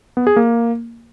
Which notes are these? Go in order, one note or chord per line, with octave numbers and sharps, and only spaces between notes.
B3
G#4
A#3